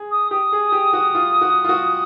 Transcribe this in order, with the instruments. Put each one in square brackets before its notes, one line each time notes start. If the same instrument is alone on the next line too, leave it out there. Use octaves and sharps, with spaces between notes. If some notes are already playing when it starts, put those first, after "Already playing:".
Already playing: [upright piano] G#4
[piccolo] D#6
[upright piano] G4 [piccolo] D#6
[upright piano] G#4
G4
F#4
F4
F#4
F4
F#4